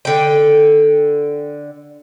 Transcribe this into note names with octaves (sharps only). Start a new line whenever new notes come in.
D3 G5